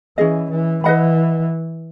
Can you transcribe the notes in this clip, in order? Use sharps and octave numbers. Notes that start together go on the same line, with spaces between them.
E3 C#4 G#4 D#5
E3
E3 B4 D#5 F#5 B5